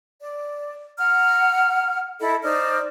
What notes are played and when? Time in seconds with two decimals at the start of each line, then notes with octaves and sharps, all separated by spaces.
0.20 D5
0.98 F#5 A#5 F6
2.20 E4 A4 D#5 B5
2.43 D#4 C5 D5 F6